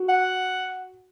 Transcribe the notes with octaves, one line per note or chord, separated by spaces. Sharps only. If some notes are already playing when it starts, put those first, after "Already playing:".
Already playing: F#4
F#5